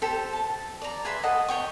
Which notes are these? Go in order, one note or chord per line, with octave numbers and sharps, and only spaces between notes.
G4 A4 C5
A5
D5 A#5
G#4 B4 E5 C6
A4 D#5 F#5
C#5 G5 C#6